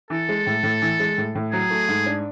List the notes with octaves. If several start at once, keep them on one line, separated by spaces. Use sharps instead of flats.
E3 A4
G#3
A2
A2
E3
G#3
A2
A2
F#3 G#4
A3
G#2
D4